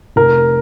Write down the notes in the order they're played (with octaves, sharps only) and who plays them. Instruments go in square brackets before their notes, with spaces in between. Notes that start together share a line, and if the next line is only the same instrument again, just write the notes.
[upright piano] F1 [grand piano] A#4